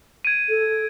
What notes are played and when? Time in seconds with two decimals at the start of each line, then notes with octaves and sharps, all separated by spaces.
0.25 G#6 D7 D#7
0.49 A4